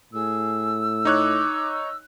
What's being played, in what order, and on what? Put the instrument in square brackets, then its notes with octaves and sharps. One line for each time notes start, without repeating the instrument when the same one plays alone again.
[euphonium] A2 [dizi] G#4 [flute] E6
[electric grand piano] D#4 C#5 F#6 [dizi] D6